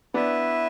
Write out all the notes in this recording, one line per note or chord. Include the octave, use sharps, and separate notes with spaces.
B3 D4 E4 B4 E5